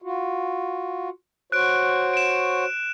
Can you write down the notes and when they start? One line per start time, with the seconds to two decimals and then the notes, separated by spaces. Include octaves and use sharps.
0.02 F4 F#4
1.52 F#4 C5 C#5 F#6 D7
2.14 D7 E7